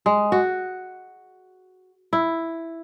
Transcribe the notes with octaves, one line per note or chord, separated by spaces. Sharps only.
G#3
F#4
E4